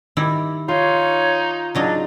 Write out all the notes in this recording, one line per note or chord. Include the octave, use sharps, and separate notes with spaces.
D#3 G3 E4
D#4 F4 C#5
C#3 F#3 D4 D#4